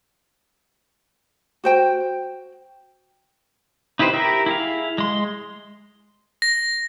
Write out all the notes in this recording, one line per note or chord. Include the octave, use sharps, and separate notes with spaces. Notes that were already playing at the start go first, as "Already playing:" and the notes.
F#4 C5 G5
D#4 E4 G4 B4 C5
E4 G4 A#4 E5
E4 G#4 F5
G#3 C6
A#6